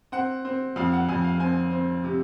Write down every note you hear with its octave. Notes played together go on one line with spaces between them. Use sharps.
C4 F#5
C4
F2 F5
F#5
F2 G#5
F5
C4 G#5
C4
C3